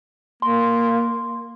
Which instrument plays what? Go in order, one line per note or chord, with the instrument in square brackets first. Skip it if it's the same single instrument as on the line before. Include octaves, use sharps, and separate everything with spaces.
[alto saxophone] A#3 [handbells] C6